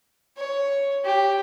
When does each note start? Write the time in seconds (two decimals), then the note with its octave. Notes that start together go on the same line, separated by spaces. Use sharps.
0.37 C#5
1.05 G4